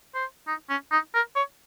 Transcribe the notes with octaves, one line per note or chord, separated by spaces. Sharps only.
C5
D#4
C#4
D#4
A#4
C#5